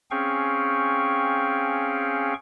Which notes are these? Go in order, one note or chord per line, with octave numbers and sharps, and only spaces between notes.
C4 C#4 G#4 F5 G5 C#6